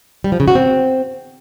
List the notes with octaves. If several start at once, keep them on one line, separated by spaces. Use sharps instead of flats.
G3
F3
C#3
F#4
C4